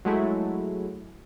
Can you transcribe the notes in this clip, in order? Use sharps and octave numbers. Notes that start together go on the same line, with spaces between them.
F#3 G#3 A3 E4 F#4